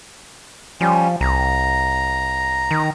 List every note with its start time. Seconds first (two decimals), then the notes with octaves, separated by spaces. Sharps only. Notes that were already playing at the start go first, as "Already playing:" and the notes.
0.81 F3 G3 C#4
1.21 C2 A#5
2.71 D#3